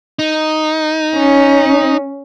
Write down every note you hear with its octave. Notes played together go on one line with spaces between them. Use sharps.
D#4
C#4